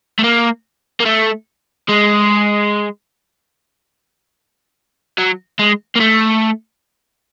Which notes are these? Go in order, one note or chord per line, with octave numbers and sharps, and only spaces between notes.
A3
A#3
A#3
A3
G#3
F#3
G#3
A#3
A3